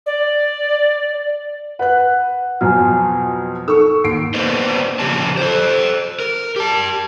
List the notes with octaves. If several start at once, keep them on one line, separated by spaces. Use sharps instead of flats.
D5
B4 F#5 F#6
F2 B2 F#3 G#5 A#5 F6
D#4 A4 A#4 C#6 E6
D#2 C7 D7
A#3 B3 D4 B4 C5 D#5
C#3 F3 G4 C#5 A5
A4 C5
A#4
G4 A5